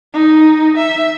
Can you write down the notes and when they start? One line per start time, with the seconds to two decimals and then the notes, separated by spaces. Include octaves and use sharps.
0.14 D#4
0.77 E5